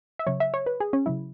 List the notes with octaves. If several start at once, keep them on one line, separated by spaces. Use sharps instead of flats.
E5
C#3 F#3 C#5
E5
C#5
B4
G#4
C#4
C#3 F#3 E4